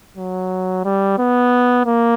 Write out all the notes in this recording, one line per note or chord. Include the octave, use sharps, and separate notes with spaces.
F#3
G3
B3
A#3